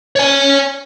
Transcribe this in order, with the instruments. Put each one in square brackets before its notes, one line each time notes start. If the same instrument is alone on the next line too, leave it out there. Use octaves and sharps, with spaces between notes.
[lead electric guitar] C#5 G#5